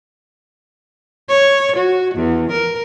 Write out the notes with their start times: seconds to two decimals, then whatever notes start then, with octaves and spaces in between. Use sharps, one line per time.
1.28 C#5
1.77 F#4
2.15 E2
2.52 A#4